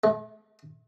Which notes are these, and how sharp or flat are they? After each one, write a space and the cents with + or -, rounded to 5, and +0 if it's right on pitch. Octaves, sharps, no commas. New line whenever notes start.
A3 -40